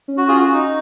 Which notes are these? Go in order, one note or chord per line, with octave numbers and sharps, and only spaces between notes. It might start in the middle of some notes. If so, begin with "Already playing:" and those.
C#4
F#4
F4 G#4
F#4
D#4